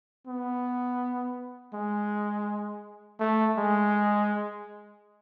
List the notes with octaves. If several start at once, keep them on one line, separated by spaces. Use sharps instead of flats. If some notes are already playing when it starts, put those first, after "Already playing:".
B3
G#3
A3
G#3